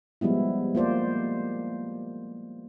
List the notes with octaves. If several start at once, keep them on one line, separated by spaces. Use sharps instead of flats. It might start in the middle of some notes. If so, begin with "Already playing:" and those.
F3 G3 G#3 B3 E4
A#3 F4 C5 D5